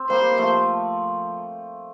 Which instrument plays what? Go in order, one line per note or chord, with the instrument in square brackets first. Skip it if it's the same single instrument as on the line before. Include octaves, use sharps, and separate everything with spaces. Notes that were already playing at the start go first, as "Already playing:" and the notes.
Already playing: [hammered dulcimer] C4
[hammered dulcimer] G3 A#3 [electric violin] C5
[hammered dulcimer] F3 A3